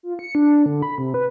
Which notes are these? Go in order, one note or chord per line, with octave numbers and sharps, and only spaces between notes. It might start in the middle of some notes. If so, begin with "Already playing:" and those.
F4
C#7
D4
D3
B5
C3
B4